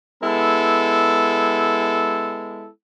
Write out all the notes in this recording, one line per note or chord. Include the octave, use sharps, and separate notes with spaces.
G#3 B3 E4 A4